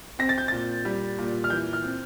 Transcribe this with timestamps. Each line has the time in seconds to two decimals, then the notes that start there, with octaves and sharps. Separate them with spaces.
0.19 C4 A#6
0.29 A6
0.38 G6
0.48 A#2 A6
0.85 G3
1.18 A#2
1.44 F6
1.50 E3 G6
1.73 F6
1.84 C4